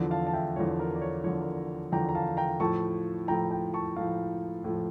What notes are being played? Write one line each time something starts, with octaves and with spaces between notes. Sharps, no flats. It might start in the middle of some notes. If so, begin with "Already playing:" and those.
Already playing: E2 D3 F3
F5 A5
A5
E5 G5
E2 D3 F3 C#5
A#4
D5
C#5
E2 D3 F3 C#5
A#4
E2 D3 F3 G5 A#5
A#5
F5 A5
G5 A#5
A2 F3 A5 C#6
A2 F3 G5 A#5
G5 A#5
A5 C#6
A2 F3 F5 A5
A2 F3